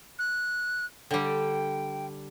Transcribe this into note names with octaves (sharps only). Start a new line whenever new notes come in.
F#6
D3 G3 G5